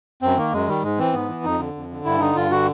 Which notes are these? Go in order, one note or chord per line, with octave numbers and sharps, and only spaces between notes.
F#2 C4
D#3 A#3
F#2 G#3
D#3 G3
G#2 G#3
E3 C4
G#2 B3
E3
F2 D#4
D3
F2
D3
G2 E4
D3 D#4
G2 F4
D3 F#4